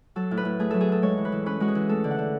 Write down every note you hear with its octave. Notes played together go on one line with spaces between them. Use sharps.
F#3 A4
A2
B4
A2
A3 G#4
F#3 A4
G#4
A2 A4
G#3 C#5
E3
B4
E3
C#4 B4
G#3 F#4
G#4
E3
A3 A4
D3
F#5
D3